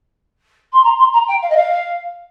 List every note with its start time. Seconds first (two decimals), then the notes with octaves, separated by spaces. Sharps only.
0.72 C6
0.83 A#5
0.98 C6
1.12 A#5
1.27 G5
1.42 F5
1.49 D#5
1.56 F5